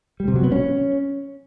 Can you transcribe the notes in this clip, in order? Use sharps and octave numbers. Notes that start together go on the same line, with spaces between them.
G3
C3
F#3
B3
C#4